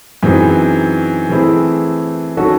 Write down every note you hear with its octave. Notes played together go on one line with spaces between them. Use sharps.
F#2 E3 C4 D#4 G#4
E3 A3 C4 E4 G#4
D#3 F#3 C#4 F#4 A4